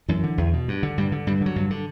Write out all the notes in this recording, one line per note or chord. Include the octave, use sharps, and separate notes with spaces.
F#2 E3
D3
E2
B2
G2
D3
G2 G3
D3
G2 G3
D3 F#3
G2
D3